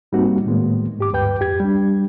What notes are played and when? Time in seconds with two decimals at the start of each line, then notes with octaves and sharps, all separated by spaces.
0.12 G#2 G3 A#3 C4 D#4 F#4
0.46 A2 D#3 G#3 A#3 B3
0.99 G#2 G4 D6
1.13 D2 G2 B4 G5 G6
1.40 F2 G4 G#6
1.60 G3 D4